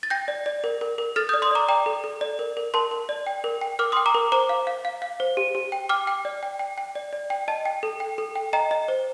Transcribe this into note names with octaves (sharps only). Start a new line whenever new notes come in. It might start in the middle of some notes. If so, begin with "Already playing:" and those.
A6
G5 G6 A#6
D5
D5
A#4
A#4
A#4
A4 F6 A6
D5 D#6 G6
C6 D#6
D5 A#5 D6
D5 G5 A#5
A4
A4
D5
A#4
A#4
A#4 A5 C6
A#4
D5
G5
A#4
G5
A#4 D6 F6
G5 C6 D#6
A#5 D6
A#4
C5 A#5 D6
F5
F5
F5
F5
C5
G4
G4
G5
G5 D6 F6
G5
D5
G5
G5
G5
D5
D5
G5
D#5 A5
G5
A4
G5
A4
G5
D#5 G5 A#5
D#5
C5